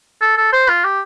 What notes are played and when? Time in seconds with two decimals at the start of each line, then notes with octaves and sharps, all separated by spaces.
0.21 A4
0.37 A4
0.52 C5
0.68 F4
0.84 G4